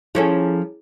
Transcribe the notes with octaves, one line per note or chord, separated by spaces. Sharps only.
F3 C#4 E4 G#4 A4